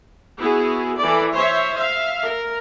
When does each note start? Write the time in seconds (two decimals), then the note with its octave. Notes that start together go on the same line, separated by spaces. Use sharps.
0.38 B3 E4 F#4 G#4
0.98 E3 A4 D5
1.33 C5 C#5 E5
1.76 E5 F5
2.24 A#4